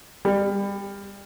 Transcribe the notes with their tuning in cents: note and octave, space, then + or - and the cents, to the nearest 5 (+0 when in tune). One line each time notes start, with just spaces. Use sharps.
G3 +25